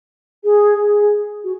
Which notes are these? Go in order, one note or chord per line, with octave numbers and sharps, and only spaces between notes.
G#4
F#4